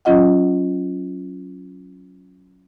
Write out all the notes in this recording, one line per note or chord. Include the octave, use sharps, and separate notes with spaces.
F#3 C#4 F4 D#5 F#5